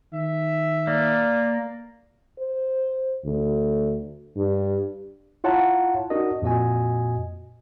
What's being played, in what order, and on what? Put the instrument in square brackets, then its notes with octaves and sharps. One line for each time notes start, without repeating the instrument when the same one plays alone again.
[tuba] D#3 [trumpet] E5
[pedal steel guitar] A#3 [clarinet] D5
[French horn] C5
D2
G2
[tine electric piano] E4 F4 C#5 F#5 A5 A#5
D4 D#4 F#4 A#4 D#5
F2 A#2 F#4 D#5 G#5